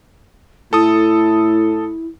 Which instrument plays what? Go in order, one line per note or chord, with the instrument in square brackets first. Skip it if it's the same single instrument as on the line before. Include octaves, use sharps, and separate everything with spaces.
[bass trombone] A2 [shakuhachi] E4 [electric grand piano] A4 D#6